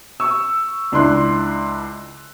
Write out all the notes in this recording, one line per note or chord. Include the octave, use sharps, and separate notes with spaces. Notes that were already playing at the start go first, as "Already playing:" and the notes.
C#6 E6
C#2 D4 E4 C6 F#6